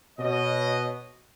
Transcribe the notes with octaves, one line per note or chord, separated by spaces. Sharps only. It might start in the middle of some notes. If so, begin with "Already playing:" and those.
B2 C#5 D#5